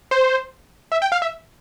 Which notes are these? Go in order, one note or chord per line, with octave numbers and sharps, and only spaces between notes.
C5
E5
G5
F5
E5